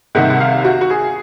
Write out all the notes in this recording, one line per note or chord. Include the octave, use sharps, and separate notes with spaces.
C2 C3 D#3 F#5
F#5
F5
F#4
F#4
G#4